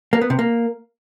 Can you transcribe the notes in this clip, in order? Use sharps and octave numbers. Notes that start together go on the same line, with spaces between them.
A#3
B3
C3
A#3